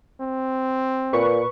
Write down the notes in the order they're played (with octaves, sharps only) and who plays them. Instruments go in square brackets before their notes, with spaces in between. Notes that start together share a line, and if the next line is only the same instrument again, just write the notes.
[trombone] C4
[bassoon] A#2 [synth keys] B4 C#6